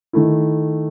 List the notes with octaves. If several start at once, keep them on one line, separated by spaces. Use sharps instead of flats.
D#3 A3 E4